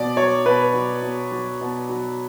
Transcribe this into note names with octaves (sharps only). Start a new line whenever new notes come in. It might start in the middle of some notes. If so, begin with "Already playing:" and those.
Already playing: B2 D5
F#3 C#5
B2 B4
F#3
B2
F#3
B2
F#3